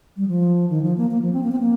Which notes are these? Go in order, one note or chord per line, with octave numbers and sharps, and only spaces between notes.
G3
F3
D#3
F3
A#3
A#3
F3
C4
A#3
C4
A#3